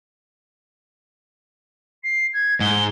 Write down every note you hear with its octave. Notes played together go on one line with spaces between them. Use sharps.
C7
G#6
G#2 G7